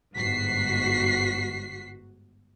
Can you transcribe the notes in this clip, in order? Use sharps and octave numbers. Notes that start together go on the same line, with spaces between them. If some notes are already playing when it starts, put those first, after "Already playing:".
G1 G#2 F#4 B6 C7